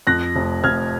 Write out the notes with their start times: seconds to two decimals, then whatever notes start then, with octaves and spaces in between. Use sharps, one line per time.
0.07 F2 F#6 A#6
0.35 F1
0.63 F1 F6 G#6